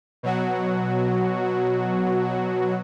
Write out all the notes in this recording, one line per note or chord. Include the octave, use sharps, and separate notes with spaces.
B2 F#3 F#4